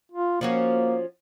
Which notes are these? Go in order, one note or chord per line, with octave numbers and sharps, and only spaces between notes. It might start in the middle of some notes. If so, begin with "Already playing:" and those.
F4
F3 A#3 C#4 F#4